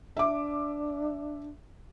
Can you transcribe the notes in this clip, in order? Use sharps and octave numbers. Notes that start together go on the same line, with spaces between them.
D4 E5 D6